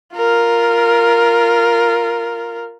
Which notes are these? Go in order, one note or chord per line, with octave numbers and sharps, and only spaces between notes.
F4 A#4